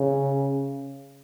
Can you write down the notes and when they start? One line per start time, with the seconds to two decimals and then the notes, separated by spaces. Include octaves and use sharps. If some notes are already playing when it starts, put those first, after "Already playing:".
Already playing: C#3